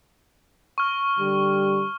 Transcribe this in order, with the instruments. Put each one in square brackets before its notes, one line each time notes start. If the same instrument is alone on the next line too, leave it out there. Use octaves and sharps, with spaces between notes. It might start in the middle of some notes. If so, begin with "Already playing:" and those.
[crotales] C#6 F6
[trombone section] D3 G3